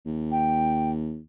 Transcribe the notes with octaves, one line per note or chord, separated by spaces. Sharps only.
D#2
G5